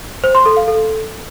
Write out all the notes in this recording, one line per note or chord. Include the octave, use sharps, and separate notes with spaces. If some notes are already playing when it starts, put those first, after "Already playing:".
C5
C6
A4
F5
A4